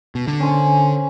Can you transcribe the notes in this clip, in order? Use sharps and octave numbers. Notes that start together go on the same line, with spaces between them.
B2
D3
C#4 C5 G#5